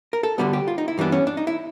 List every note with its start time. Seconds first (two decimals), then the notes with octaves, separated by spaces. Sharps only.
0.13 A#4
0.23 A4
0.38 D2 D3 G3 B3 F#4
0.53 G4
0.68 F4
0.78 D#4
0.88 E4
0.98 G2 E3 G3 B3 D4
1.12 C#4
1.27 D4
1.37 D#4
1.47 E4